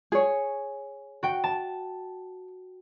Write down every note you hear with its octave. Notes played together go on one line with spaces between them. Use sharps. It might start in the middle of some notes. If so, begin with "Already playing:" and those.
G#4 C#5
F#4 G5
A5